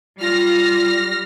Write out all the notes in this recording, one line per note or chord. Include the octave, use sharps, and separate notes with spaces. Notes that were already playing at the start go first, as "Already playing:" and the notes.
G3 F4 F6 A#6